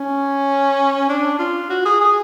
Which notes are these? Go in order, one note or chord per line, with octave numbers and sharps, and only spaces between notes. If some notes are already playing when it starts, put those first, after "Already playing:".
Already playing: C#4
D4
F4
F#4
G#4
G#4